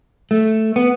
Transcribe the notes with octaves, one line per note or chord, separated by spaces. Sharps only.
A3
B3